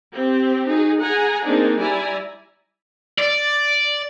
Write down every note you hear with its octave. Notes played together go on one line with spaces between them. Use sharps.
C4 G4
D#4 F#4 G#4
G#4 F#5 G#5 A#5
A#3 C4 D4 D#4 G#4
G3 E4 D5 E5 G#5 A#5
D5